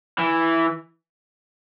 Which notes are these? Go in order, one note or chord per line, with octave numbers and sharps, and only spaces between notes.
E3